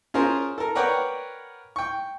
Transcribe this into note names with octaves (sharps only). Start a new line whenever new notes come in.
C#4 F4 G#4 A#4 C5
A4 A#4
A#4 B4 C#5 D5 F#5 G5
G5 C#6